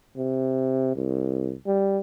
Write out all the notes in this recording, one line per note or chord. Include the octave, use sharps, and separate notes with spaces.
C3
C2
G3